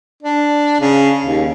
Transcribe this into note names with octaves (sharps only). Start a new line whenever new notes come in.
D4
C#3
D#2